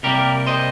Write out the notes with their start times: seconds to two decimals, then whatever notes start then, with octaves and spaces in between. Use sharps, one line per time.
0.03 C3 G3 A#3 G4 A#4
0.47 C5 D#5